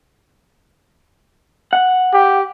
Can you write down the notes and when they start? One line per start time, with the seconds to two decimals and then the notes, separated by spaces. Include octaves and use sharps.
1.73 F#5
2.13 G4